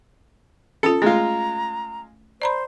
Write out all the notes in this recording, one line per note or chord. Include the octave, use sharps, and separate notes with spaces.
C#4 F4 A4
G#3 A3 F4 A#5
C5 D5 A#5 B5